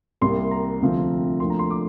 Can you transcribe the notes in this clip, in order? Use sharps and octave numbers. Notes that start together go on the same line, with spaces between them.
C2 C3 G3 A#3 C6
A#5
D2 C3 F3 C4
D2 D3 F3 A#3 C6
A#5
C6
D6